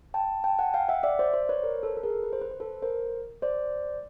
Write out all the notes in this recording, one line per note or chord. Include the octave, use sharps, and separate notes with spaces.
G5 A5
G5 A5
F#5 G#5
F5 G5
E5 F#5
D5 E5
C5 D5
C5 D5
B4 C#5
A#4 C5
A4 B4
A4
G#4 A#4
B4
C5
B4
C5
A4 B4
A#4 C5
C5 D5